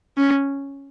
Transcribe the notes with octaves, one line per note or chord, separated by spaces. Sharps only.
C#4